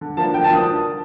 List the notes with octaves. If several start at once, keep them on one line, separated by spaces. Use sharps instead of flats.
D3
F3 A#3 D4 A5
D3 G5
A5
F3 A#3 D4 D#6